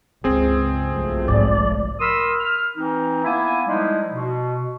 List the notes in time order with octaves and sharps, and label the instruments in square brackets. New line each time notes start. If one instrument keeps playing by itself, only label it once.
[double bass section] C#2 [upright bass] G2 D4 [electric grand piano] C4 G#4
[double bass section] B1 F3 A3
[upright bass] F#1 G#2 [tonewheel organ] D5
[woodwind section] A#4 B5 C6 D#6 E6
F6
E3 C4 D#4
A#3 B3 E4 E5 G#5
F3 G3 G#3 D#4 E4
B2